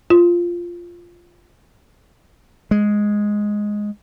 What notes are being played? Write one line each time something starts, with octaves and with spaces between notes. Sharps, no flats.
F4
G#3